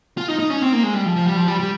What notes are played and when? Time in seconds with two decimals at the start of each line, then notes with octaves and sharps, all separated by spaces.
0.17 F4
0.29 D#4
0.39 D#4
0.50 C#4
0.62 C4
0.73 A#3
0.83 G#3
0.94 G3
1.05 F3
1.16 F3
1.27 G3
1.37 F3
1.48 G3
1.60 G3